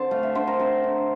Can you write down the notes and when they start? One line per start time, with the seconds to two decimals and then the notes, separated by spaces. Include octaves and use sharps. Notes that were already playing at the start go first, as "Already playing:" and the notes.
Already playing: D3 C4 A5 C6
0.11 A3 F5
0.23 E5
0.35 D3 C5
0.47 A#4
0.59 C4 A#4
0.84 D3